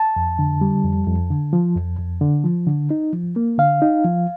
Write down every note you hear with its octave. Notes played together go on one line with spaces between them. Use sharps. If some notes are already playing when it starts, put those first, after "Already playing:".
Already playing: A5
F2
D3
G3
F2
F2
D3
F3
F2
F2
D3
F3
D3
D#4
F3
A#3
D3 F5
D#4
F3